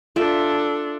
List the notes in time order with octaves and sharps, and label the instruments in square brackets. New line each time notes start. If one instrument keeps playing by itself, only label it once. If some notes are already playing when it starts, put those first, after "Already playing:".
[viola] D4 A4 [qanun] F4 D5 E5